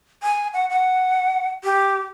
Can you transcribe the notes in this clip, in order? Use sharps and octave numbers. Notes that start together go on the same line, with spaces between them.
G#5
F#5
F#5
G4